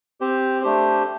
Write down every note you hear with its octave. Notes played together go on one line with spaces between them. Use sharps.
C4 G4 C5
A3 D4 G4 C5